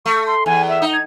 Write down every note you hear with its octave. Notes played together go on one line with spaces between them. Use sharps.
A3 C#6
C6
E2 G#5
E5
D#4
G#6